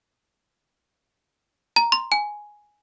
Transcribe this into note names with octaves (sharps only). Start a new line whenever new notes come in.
A#5
C6
G#5